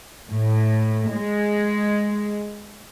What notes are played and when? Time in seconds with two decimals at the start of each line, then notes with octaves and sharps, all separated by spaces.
0.30 A2
1.12 G#3